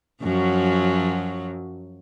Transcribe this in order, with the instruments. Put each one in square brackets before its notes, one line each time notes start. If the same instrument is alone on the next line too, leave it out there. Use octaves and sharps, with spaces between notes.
[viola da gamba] F#2 F3 F#3